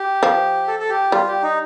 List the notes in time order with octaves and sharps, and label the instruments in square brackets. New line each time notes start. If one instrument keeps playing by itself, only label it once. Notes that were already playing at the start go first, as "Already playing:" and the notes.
Already playing: [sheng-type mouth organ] G4
[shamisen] F3
[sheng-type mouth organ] A4
A4
G4
[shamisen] G3 [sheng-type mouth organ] F4
[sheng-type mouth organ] G4
D#4